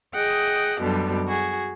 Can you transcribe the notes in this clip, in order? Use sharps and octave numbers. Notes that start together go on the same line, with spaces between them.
G#4 D#5 F#5 G5
F#2 B2 D3 G3
F#4 G#4